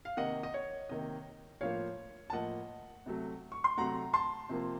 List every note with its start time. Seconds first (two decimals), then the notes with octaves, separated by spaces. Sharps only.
0.05 F5
0.17 C3 D#3 A#3 D#5 F#5
0.43 D#5
0.54 C#5
0.89 C3 D#3 A#3 D#5
1.61 A2 F3 A#3 C#5 F5
2.30 A5
2.33 A2 F3 A#3 D#5 F#5
3.06 C3 F#3 A3
3.52 C#6
3.64 C6
3.77 C3 F#3 A3 F#5 A#5
4.13 A5 C6
4.49 C3 F3 A#3